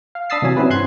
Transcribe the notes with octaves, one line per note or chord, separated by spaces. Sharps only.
F5
D4 B5 D#6 E6 A6 C7
C3 E3 F#3 G#5
C4 C#4 E4 F#4 B4
G2 C6 F#6 G#6